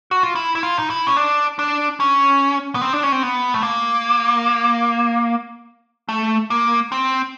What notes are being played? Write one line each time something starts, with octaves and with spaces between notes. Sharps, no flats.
F#4
F4
E4
E4
F4
D#4
E4
C#4
D4
D4
C#4
B3
C4
D4
C#4
C4
B3
A3
A#3
A3
A#3
C4